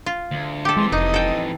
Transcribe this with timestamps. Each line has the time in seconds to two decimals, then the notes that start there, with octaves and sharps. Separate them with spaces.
0.06 F4
0.31 D2
0.65 G4 A4
0.77 F2 E3 G#3 C6
0.92 F1 D#4 D#5
1.14 A4 G5